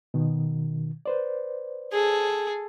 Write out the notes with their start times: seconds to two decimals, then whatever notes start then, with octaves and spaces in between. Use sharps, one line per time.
0.14 B2 D#3
1.06 B4 C5 D5
1.93 G#4 A4